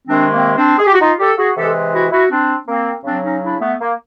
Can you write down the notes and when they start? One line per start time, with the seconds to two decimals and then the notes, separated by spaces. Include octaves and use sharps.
0.07 C3 D#3 G#3 C4 D4
0.32 A#3 C4
0.56 C4 D4
0.78 G#4
0.87 G4
0.93 F#4
1.00 D#4 F4
1.19 G4 A4
1.37 F#4 G#4
1.55 C3 E3 G#3 G4 A4
1.93 E4 F#4
2.12 E4 F#4
2.30 C4 D4
2.67 A#3 C4
3.04 C#3 F#3 C4 D4
3.23 C#4 D#4
3.42 D4 E4
3.61 A3 B3
3.80 A#3